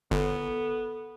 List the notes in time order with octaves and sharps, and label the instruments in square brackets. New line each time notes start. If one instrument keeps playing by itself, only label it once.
[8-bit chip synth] G1 [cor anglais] B3 [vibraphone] A4